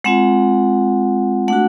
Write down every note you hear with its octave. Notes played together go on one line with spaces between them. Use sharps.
G#3 C4 F4 F#5
A3 D4 F#4 F#5